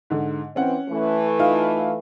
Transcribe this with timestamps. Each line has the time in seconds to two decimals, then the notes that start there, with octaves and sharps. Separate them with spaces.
0.10 G#2 D3
0.56 E3 C4 C#4 F#5
0.89 E3 A3
1.39 D#4 F4 F5